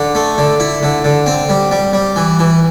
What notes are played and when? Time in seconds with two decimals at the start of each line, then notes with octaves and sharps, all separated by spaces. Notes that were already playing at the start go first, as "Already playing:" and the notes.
Already playing: D3
0.15 A3
0.38 D3
0.60 E4
0.83 D3
1.04 D3
1.26 C4
1.49 G3
1.71 G3
1.93 G3
2.16 E3
2.39 E3